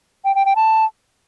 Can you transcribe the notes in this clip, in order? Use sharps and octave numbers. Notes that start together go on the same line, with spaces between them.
G5
G5
G5
A5